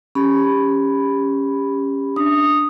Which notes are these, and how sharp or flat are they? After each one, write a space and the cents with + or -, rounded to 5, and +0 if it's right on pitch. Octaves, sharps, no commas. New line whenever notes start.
C#4 +0 G4 +20 B5 +0
D4 +0 D#6 -5